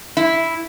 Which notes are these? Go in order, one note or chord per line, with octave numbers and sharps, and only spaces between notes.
E4